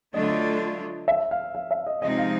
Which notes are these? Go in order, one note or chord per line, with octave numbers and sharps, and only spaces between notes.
D3 F#3 A3 D4 F4 D#5
E5
F5
F5
E5
D#5
C3 F3 G#3 C4 D#4 D#5
F5